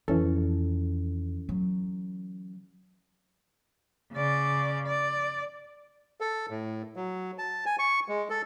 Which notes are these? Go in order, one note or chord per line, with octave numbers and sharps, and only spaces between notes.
F2 E3 C#4 A4
F#3
C#3 D5
D5
A4
A2
F#3
A5
G#5
C#6
G#3
A4